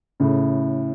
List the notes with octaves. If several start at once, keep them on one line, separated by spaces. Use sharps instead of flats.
A2 C#3